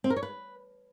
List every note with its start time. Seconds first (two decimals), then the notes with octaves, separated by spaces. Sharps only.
0.04 C4
0.10 A#4
0.16 C#5
0.23 B4